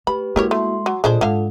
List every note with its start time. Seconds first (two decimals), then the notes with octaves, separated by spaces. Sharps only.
0.07 A3 G4 B4 B5
0.36 G#3 A#3 E4 F#4 G4 A#4 C#5
0.51 A3 C6
0.86 F#3
1.04 A#2 G#3 D4 F4 A4 C5
1.21 G#2 D3 F5